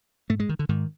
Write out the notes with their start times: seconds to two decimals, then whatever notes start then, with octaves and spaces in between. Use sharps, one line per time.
0.30 G#2 A3
0.40 G#3
0.49 D#3
0.59 D3
0.69 G#2 D#3